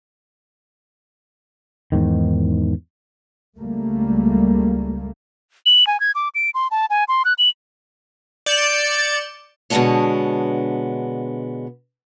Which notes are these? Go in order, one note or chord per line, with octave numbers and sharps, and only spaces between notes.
E2 G#2 D#3
C#2 G3 A3 A#3
F#7
G#5
G#6
D6
D7
C6
A5
G#5
C6
F#6
F#7
D5 G6 C#7 E7
B2 D3 G#3 B3 D4 C#5